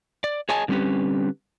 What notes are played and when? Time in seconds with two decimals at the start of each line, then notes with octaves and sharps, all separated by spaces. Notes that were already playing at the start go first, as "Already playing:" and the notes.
0.24 D5
0.49 G#4 C#5 D#5 G#5 A5
0.68 D3 G3 C4 C#4 G4 B4